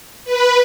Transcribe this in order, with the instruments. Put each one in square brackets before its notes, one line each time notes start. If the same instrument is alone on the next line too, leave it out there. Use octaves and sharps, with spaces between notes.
[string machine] B4